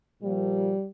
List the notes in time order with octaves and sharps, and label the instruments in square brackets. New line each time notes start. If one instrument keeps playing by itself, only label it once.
[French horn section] A#2 F3 G3